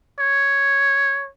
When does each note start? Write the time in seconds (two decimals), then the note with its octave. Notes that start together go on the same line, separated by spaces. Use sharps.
0.20 C#5